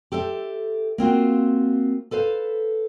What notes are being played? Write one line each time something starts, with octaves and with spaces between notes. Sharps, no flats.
G4 A4 C5 E5
A#3 C4 F4 F#4
A4 B4 C5 F5